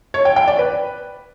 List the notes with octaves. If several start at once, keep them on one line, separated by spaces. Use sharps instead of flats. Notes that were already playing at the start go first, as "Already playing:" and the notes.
C#5
G5
G5
D5
B4